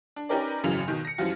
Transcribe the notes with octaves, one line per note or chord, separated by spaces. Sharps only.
D4
C#4 D#4 G4 A#4 B4 D5
G#1 F#2 C#3 E3 F#3 F7
B2 D#3
A#6 C#7
F#2 E3 F3 G3 F4 F#4